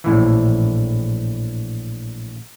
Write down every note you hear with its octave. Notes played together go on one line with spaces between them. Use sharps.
A#1 A2 E3